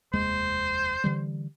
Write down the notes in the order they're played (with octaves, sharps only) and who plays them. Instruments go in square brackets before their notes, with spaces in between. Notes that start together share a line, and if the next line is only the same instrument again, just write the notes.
[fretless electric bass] F1 D#2 G#3 [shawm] C5
[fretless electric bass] D3 E3 G3